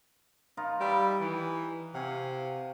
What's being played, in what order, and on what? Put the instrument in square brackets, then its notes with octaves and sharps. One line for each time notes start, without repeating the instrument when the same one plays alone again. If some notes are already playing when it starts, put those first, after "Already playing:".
[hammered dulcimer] D#4 F4 A#4
[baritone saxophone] G3 [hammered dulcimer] B4 E5 B5
[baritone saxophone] E3
[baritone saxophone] C3 [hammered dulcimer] F#4 F5 G#5